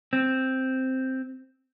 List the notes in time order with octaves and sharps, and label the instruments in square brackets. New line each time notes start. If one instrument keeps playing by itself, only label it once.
[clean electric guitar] C4